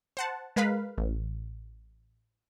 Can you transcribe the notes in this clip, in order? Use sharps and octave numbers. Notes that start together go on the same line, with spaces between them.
C5 F#5 A5
G#3 A#4 B4 F5 B5
A1